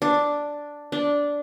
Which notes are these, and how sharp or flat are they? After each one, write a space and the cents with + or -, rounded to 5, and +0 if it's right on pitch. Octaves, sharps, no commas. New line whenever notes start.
D4 +0
D4 -10